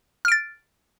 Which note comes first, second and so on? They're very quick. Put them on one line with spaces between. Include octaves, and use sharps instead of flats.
F6 D7 A6